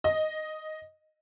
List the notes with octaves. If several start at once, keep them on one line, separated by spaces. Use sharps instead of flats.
D#5